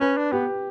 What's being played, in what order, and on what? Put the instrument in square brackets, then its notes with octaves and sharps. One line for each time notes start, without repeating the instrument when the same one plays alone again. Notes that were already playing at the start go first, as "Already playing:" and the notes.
[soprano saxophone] C#4 [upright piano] B4
[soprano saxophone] D4
[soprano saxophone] B3 [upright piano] G4